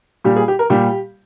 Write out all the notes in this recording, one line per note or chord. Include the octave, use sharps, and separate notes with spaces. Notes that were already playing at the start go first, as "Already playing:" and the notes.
A#2 G3 G4
G#4
G4
A#4
A#2 G3 G4